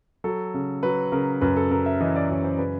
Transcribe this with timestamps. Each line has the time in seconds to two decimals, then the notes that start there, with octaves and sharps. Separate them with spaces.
0.24 F#3 A4
0.54 C#3
0.83 F#3 B4
1.12 C#3 A#4
1.41 F#2 B4
1.56 A4
1.71 C#3 A#4
1.86 E5
2.01 E3 D#5
2.16 D5
2.29 F#2 C#5
2.44 C5
2.59 C#3 B4